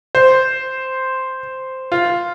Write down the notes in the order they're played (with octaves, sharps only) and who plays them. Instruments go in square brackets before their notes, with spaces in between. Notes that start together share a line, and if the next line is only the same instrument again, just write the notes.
[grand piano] C5
F4